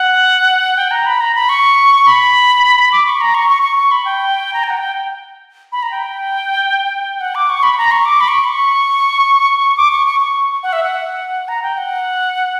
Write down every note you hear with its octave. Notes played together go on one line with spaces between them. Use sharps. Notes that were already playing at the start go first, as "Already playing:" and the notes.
Already playing: F#5
G5
A#5
B5
A#5
B5
C#6
B5
D6
C#6
A#5
C#6
C#6
C#6
C#6
B5
G5
A#5
G5
F#5
G5
B5
A#5
G5
F#5
D6
C#6
B5
A#5
C#6
D6
B5
C#6
B5
C#6
D6
C#6
C#6
C#6
F#5
E5
F#5
A#5
G5
F#5